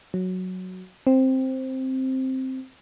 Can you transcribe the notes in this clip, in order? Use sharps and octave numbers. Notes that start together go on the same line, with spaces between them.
F#3
C4